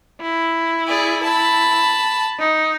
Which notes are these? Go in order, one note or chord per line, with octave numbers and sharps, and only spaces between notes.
E4
G#4 D5
A5 B5
D#4